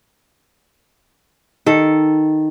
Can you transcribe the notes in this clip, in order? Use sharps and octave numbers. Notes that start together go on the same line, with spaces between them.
D#3 A4